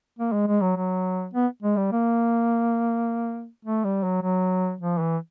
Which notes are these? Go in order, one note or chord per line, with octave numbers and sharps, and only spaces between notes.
A#3
G#3
G#3
F#3
F#3
B3
G#3
G3
A#3
A3
G3
F#3
F#3
F3
E3